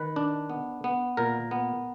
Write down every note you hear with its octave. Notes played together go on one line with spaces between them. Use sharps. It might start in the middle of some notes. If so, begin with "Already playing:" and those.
Already playing: D#3 B4
D4
B3
B3
A#2 A#4
B3